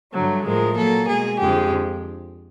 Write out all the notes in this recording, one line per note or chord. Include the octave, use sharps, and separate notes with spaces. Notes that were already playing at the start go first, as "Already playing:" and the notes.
G2 D3 F#3 A3
A2 F3 G#3 A#4
A#2 F#3 A#3 A4
B2 G#3 G#4
F2 D3 F3 G#3 G4